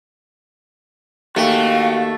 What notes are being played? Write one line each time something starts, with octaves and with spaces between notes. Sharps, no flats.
D#2 A3 F#4 F5 G5